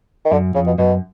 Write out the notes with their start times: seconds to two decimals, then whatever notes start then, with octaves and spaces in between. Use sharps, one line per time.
0.25 D#3
0.32 F#2 D3
0.54 F2 C#3
0.66 B2
0.78 F#2 B2